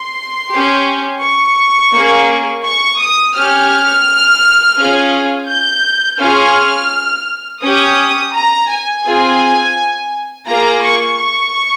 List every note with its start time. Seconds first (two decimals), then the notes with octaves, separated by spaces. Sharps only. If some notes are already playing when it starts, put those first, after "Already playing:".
Already playing: C6
0.51 C#4 G4
1.22 C#6
1.93 A#3 C#4 G#4
2.64 C#6
2.99 D#6
3.35 C#4 G4 F6
4.77 C#4 F4 G#4
5.48 G6
6.19 C#4 F4 G#4 F6
7.62 C#4 G4 D#6
8.33 A#5
8.69 G#5
9.04 C4 F4 G#4
10.47 A#3 F4 G#4 A#5
10.82 C#6
11.18 C#6